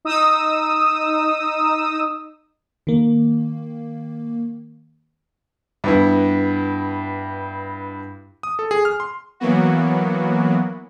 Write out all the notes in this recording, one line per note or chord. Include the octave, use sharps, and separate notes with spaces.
D#4 D#6 E6
D#3 A#3
G2 B3 E4
D#6
A4
G#4
F6
C6
E3 F#3 A#3 B3 F#4